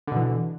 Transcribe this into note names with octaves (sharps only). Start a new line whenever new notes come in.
B2 D3 E3